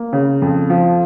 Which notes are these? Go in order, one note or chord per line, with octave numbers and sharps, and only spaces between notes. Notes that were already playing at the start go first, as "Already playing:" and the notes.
Already playing: A#3
C#3
F2
F3